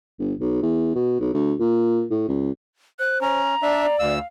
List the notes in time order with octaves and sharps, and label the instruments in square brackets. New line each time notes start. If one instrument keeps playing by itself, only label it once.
[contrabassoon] G1
B1
E2
B2
B1
D2
A#2
A2
C#2
[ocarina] C5 [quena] F#6
[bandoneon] C#4 [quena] A#5
[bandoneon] D4 E5 [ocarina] D5
[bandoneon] D2 E6 [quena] F5